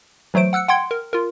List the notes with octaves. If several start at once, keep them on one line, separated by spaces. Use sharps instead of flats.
E3 F#3 A3 C5 D7
F#5 E6 F#6 C#7
F#5 G5 C6 G#6 C#7
A#4
F4 A#4